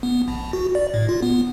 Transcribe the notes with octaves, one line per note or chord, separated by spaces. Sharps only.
B3
A#1
F#4
D5
A2
F4
B3